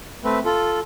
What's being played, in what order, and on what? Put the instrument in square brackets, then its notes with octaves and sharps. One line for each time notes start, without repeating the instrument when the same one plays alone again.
[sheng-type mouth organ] A3 C4 B4
F4 A4